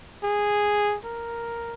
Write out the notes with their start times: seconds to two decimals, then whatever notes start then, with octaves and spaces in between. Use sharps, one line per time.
0.23 G#4
1.04 A#4